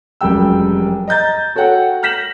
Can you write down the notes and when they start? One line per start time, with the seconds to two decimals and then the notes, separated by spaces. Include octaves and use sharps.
0.21 F1 F#2 G3 G#3 G5 E6
1.08 D#5 A#5 G6 A6
1.56 F#4 A4 C#5 F#5 G5
2.03 F6 G6 A#6 B6 E7 F#7